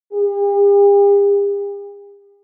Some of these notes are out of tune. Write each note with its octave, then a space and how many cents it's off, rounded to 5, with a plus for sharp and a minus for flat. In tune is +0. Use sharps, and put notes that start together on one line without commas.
G4 +45